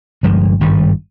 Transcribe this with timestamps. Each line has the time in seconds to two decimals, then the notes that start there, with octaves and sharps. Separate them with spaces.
0.23 G1 G2 F3 G#3
0.61 G#1 G2 D#3 G3